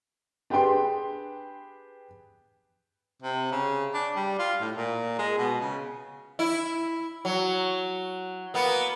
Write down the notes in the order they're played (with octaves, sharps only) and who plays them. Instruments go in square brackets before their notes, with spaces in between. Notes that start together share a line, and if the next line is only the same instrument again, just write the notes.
[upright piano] D4 G4 G#4 B4 G5 C6
[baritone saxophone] C3
C#3
D4
G3
F4
A2
A#2
G#3
B2
C#3
[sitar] E4
F#3
A#3 B3